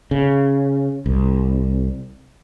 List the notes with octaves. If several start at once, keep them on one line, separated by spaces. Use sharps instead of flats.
C#3
C2